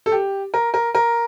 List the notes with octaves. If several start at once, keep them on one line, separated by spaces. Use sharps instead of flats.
A4
G4
A#4
A#4
A#4